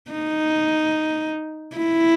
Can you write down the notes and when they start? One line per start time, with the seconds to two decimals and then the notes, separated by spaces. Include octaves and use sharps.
0.11 D#4
1.77 E4